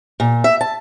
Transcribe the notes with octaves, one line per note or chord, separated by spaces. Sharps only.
A#2
E5
A5